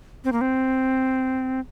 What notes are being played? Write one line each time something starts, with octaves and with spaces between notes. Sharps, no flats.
C4
A#3
C4